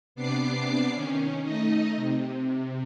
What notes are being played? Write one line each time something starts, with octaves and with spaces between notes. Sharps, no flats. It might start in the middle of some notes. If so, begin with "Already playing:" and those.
C3 B3 D4 D6 C7
D#3 C#4
A3 D#4 D#5
C3